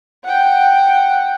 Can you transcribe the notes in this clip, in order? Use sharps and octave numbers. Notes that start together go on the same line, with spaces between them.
F#5 G5